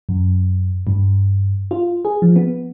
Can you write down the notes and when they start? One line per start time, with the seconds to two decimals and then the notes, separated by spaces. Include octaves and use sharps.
0.09 F#2
0.87 G2
1.71 F4
2.05 G#4
2.22 F3
2.36 B3